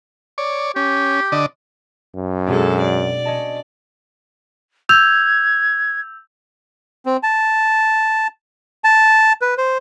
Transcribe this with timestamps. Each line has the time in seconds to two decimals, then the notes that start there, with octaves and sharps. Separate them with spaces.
0.38 C#5 D5
0.76 C#4 G4
1.32 D3 D5 D#5
2.16 F#2
2.47 B2 G#3 C4 D4 A4
2.81 D5
3.25 C#4 D#5 A5
4.89 E6 G6 G#6 F7
7.06 C4
7.23 A5
8.84 A5
9.42 B4
9.58 C5